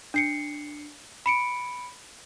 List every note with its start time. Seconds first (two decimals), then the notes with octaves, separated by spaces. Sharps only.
0.14 D4 C7 C#7
1.26 B5 C#7 D7